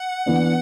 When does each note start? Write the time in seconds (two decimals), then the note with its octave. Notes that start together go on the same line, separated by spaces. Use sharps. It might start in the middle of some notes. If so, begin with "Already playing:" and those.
Already playing: F#5
0.26 E3 B3 D4